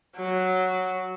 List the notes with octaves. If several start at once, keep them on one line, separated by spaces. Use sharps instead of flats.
F#3